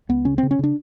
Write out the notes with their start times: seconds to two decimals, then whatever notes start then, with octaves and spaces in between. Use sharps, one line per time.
0.09 C#2 B3
0.25 C#3 C#4
0.38 C#3 C4
0.51 C#4
0.59 C#3 D4